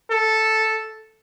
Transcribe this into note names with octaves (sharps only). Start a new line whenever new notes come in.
A4